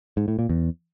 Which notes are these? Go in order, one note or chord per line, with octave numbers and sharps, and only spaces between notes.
G#2
A2
A#2
E2